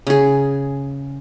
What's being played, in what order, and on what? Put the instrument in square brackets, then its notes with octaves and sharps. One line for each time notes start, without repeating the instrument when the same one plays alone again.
[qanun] C#3 G#4